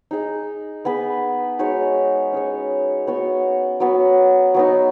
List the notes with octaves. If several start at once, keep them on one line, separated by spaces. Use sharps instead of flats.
D#4 G#4 D#5
B3 G#4 B4
G#3 D#4 F#4 C#5
C#4 G#4 C#5
B3 F#4 C#5
F#3 B3 F#4
F#3 B3 D#4